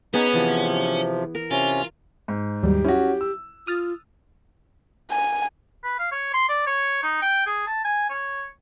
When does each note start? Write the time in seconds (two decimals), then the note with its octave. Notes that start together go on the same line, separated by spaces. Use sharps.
0.14 B3 C#4 D#4 G#4 B5
0.34 C3 E3 F3
1.35 A#4
1.51 C3 C#4 F4
2.28 G#2
2.63 D#2 F#3 G3 G4
2.84 C#4 E4 F#4
3.21 E6
3.67 F4 D#6 F6 A6
5.11 G#5
5.84 B4
5.99 F5
6.12 C#5
6.33 C6
6.49 D5
6.67 C#5
7.03 D#4
7.22 G5
7.46 G#4
7.67 A5
7.84 G#5
8.10 C#5